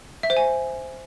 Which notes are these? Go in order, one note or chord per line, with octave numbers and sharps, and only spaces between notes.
E5
C5
G#5